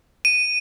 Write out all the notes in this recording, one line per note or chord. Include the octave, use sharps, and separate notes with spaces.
D#7